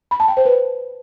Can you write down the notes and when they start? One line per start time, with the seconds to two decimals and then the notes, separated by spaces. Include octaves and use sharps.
0.11 B5
0.20 A5
0.28 G5
0.37 C5
0.45 B4